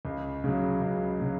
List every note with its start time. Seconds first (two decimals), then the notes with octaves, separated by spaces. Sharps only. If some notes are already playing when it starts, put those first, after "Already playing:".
0.05 C#2
0.44 C#3 F#3
0.81 C#2
1.20 C#3 F#3